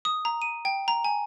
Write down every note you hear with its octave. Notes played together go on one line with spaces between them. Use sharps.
D#6
A#5
D#7
G5
A#5
G#5